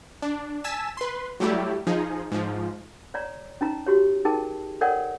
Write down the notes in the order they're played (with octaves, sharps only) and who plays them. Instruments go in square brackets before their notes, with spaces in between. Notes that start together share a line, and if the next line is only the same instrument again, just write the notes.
[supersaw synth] D4
G#5 A5 E6 B6 E7
B4 C6
F#3 G3 A3 E4 G4
F3 D#4 G#4
G#2 F3
[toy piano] C#5 D5 A#5
C#4 D#4 A#5
F#4 G4 C#5
D#4 G#4 A#4 G5 A5
A4 A#4 C#5 D5 F#5 G5